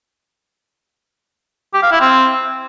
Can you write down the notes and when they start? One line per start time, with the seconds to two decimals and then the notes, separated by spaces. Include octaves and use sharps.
1.74 G4
1.83 F5
1.92 E4
2.01 C4